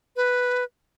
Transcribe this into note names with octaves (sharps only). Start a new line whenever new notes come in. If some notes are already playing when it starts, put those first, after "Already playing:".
B4